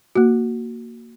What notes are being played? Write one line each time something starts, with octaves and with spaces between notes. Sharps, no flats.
A#3 F#4